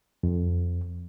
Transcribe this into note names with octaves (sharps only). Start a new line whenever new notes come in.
F2